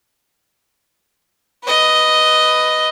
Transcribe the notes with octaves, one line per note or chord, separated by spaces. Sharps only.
B4 D#5